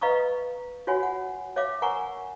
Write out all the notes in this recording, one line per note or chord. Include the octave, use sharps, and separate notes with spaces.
B4 D#5 F5 A#5 C#6 D#6
F4 F#4 C#5 F#5 G#5
F#5
C#5 E5 F5 D6
A#4 F#5 G#5 A#5 C#6